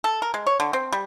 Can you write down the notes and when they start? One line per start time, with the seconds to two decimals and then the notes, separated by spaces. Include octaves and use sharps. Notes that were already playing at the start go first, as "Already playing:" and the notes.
0.04 A4
0.22 A#4
0.34 G#3
0.47 C#5
0.60 D3
0.73 C4
0.93 G3